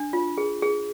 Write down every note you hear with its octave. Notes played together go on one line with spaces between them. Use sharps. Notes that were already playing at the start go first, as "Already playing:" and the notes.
Already playing: D4
F4
G#4
G#4